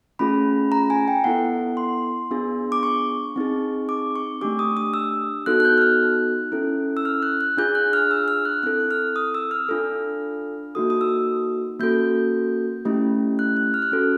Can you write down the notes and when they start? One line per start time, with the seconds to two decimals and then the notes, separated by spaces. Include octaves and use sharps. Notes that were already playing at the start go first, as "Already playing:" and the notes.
0.19 A3 C#4 F4 G#4 B5
0.72 A#5
0.90 G#5
1.08 G5
1.24 B3 E4 A4 F#5
1.77 C6
2.31 B3 D4 F4 G#4
2.72 D6
2.83 C#6
3.36 C4 D#4 G#4
3.89 D6
4.16 C#6
4.41 A3 D4 G4 D6
4.59 D#6
4.77 D#6
4.94 E6
5.46 B3 D#4 F#4 A4 F#6
5.60 F#6
5.65 G6
5.78 F6
5.82 F#6
6.52 C#4 E4 A4
6.97 E6
7.05 F6
7.23 F#6
7.41 F#6
7.57 D4 F4 G#4 G6
7.75 F#6
7.93 F6
8.11 E6
8.28 F6
8.45 F#6
8.63 C4 E4 A4 F#6
8.80 F#6
8.91 F6
9.16 D#6
9.35 E6
9.51 F6
9.69 D4 F4 A4
10.75 A#3 D#4 F#4 A4 D#6
10.90 D#6
11.01 E6
11.80 A#3 C#4 F#4 A4 G6
12.85 A3 C#4 E4 G4
13.39 F#6
13.57 F#6
13.74 F6
13.82 F#6
13.91 C#4 F#4 A4 F6